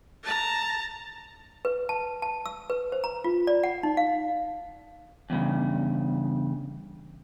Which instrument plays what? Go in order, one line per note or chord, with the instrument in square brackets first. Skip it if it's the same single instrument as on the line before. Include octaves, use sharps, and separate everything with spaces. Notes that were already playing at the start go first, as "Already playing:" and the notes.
[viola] A5 A#5
[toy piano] B4
A5
A5
E6
B4
C5
A#5
F4
D5
F#5
D#4
F5
[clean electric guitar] E2 G2 C#3